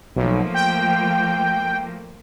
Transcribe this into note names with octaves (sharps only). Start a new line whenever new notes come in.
B1 F3 A3 A#3
G5